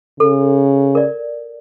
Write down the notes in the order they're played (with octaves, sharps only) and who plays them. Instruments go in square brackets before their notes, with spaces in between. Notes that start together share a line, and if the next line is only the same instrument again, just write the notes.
[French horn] C#3 [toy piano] A4
[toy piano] A#4 D5